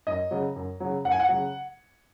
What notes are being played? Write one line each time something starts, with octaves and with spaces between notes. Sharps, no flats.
F#2 D#5
C#3 F#3
F#2
C#3 F#3
F#2 F#5
G#5
F#5
C#3 F#3